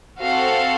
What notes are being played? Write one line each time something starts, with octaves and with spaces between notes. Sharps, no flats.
C4 F#4 A4 F5